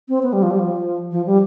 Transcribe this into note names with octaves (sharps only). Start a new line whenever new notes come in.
C4
B3
G3
F3
G3
F3
F3
G3